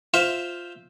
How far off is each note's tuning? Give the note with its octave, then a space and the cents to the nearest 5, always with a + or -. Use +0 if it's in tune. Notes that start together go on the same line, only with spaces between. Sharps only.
F4 +5 C5 +0 E5 +0